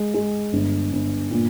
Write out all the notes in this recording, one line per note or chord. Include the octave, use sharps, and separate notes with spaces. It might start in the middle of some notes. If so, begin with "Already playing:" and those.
Already playing: G#3
G#3
G1
G1
A#2